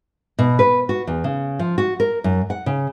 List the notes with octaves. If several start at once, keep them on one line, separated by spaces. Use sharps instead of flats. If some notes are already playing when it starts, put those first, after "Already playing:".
B2
B4
F#4
E2
C#3
F3
F#4
A#4
F#2
F#5
C#3